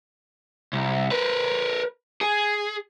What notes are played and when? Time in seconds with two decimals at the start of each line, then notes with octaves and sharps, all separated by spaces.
0.73 C2
1.11 A#4 B4
2.21 G#4